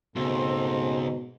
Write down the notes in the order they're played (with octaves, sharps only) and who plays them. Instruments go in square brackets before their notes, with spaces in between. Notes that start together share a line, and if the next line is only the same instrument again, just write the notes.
[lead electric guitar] C#2 [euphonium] G#2 [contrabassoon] B2 [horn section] A3 C4